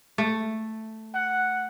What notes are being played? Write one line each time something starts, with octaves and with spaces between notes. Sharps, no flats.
A3
F#5